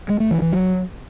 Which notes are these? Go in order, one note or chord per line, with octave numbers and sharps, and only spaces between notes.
G#3
A3
E3
E3
F#3